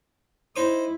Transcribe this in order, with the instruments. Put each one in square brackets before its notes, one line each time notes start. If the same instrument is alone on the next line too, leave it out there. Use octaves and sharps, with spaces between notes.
[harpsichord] D#4 C5 D#6 [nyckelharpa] E4